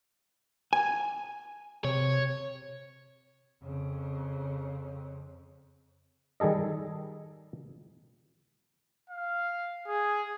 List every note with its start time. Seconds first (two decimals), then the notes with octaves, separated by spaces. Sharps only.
0.73 G#5
1.85 C3 C#5
3.63 F2 C#3
6.40 D#3 G3 G#4 A4 D#5
9.10 F5
9.87 G#4